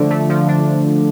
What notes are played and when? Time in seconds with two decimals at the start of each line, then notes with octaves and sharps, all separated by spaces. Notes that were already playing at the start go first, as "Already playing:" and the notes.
Already playing: D3 F3 A3 D4
0.10 A3
0.30 F3
0.48 D4